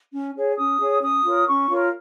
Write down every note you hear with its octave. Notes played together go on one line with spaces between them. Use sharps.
C#4
G#4 C#5
C#4 D#6
G#4 C#5
C#4 D#6
F4 A#4 C#5
C#4 C#6
F4 A#4 C#5